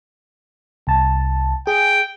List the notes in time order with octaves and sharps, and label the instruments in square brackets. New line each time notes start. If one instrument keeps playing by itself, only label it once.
[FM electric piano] C2 A5
[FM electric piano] G#4 [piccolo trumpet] G5